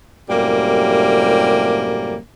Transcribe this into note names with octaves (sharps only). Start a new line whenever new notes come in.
F#2 A2 C3 G3 A#3